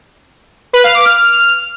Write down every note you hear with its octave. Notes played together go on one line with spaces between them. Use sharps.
B4
F5
D6
F6